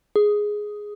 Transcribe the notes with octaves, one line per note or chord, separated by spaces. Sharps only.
G#4